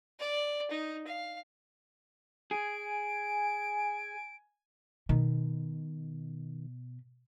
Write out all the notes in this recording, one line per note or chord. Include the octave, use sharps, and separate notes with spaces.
D5
D#4
F5
G#4 G#5 D7
B2 D#3